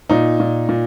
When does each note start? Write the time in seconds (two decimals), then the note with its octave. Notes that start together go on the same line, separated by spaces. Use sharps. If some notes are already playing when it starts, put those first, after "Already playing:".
0.10 A#2 D#4
0.40 A#2
0.69 A#2